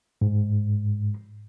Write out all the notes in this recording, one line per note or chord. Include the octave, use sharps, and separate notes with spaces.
G#2